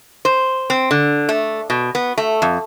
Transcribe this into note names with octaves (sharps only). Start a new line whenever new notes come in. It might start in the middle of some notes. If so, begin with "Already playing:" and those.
C5
C4
D3
A3
B2
B3
A3
F2